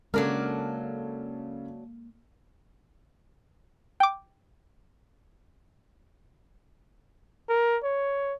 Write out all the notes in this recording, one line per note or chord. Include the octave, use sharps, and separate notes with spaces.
C#3 F#3 G#3 A#3 D4 A4 A#4 F6
G5 D6
A#4
C#5